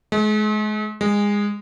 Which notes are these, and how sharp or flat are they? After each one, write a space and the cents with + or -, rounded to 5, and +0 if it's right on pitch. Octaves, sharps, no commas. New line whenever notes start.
G#3 +40
G#3 -20